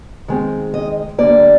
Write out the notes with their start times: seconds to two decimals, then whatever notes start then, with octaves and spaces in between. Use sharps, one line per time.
0.28 D#3 G#3 C4
0.74 D#5
1.18 D3 G3 A#3 D5